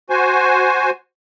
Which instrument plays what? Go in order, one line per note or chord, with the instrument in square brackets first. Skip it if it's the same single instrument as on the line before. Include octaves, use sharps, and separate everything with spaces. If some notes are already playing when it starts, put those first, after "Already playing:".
[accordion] F#4 C5 G#5